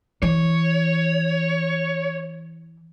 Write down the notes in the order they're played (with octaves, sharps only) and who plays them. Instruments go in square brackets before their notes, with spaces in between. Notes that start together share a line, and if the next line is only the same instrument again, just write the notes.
[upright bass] E3 [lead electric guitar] C#5